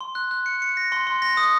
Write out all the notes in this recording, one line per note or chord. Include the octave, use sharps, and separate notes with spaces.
C6
F#6
F#6
C#7
C#7
A#6
C6
C6
A#6
D#6